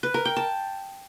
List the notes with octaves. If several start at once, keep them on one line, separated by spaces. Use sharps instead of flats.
B4
A#4
G5
A5